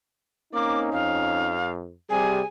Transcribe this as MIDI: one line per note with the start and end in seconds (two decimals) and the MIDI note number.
0.54 0.91 58
0.54 1.57 60
0.54 1.57 61
0.54 1.57 63
0.54 0.80 86
0.92 1.95 41
0.92 1.71 77
2.10 2.40 48
2.10 2.40 55
2.10 2.46 68
2.10 2.47 80